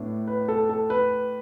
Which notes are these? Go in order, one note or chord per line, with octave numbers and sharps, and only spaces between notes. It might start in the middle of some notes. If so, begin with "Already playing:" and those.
Already playing: A2 B3 D4
B4
A4
A4
B4